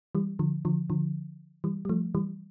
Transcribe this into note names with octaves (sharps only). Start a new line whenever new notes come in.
E3 G3
D3 F3
D3 F3
D3 F3
E3 G3
G3
F3 A3
E3 G3